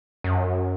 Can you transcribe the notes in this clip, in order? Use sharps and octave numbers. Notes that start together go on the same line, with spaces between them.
F#2